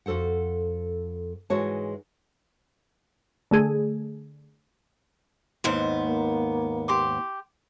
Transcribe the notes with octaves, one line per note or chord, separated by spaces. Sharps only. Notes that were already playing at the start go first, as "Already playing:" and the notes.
F2 F#4 A4 C5 F#5
G#2 E3 G#3 F#4 C#5 A5
D3 A3 G#4
D#2 G#2 B3 C5
A#3
G4 C6 D6